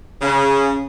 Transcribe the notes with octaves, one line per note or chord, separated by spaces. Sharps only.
C#3